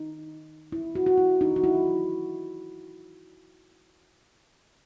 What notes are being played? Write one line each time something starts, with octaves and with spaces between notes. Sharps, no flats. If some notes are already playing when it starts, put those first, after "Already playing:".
Already playing: D#4
E4
F#4
F#4
E4
D#4
F#4
E4